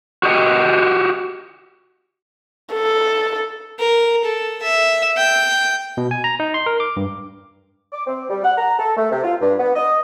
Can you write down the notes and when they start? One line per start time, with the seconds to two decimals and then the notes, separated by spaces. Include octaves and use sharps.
0.23 F#4 G4 D#5 F#5
2.74 A4
3.79 A#4
4.24 A4
4.62 E5
5.17 G5
5.97 B2
6.11 G#5
6.24 A#5
6.40 D#4
6.54 C6
6.66 A#4
6.80 D6
6.97 G2
7.93 D6
8.07 C4
8.29 G3
8.44 F#5
8.58 A#5
8.79 A4
8.97 A3
9.11 C3
9.24 F4
9.41 G2
9.60 B3
9.75 D#5